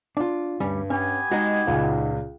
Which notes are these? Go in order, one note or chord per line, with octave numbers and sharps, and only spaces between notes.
D4 F4
D2 G2 G3 C#4
B3 C#4 G4 G#5
G#3 D#4 F#4
C#2 A#2